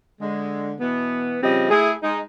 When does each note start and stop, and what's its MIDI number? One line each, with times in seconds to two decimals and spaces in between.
0.20 0.73 50
0.20 0.73 56
0.79 1.38 47
0.79 1.38 52
0.79 1.38 59
1.43 1.69 49
1.43 1.69 53
1.43 1.69 55
1.43 1.69 60
1.43 1.69 75
1.70 1.91 57
1.70 1.91 64
1.70 1.91 68
2.02 2.18 56
2.02 2.18 63